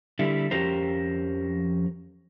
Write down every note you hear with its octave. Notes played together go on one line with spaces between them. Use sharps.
D3 G3 E4
F2 F3 C#4 G4 A#4 C5